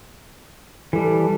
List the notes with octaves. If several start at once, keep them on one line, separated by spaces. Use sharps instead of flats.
E3 G3 A4